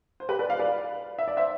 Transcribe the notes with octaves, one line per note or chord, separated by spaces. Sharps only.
C5
G4 B4
B4 D5
D5 F5
B4 D5
E5
D5
C5 E5